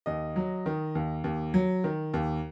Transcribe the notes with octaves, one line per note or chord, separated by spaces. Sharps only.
D#2 D#5
F#3
D#3
D#2
D#2
F#3
D#3
D#2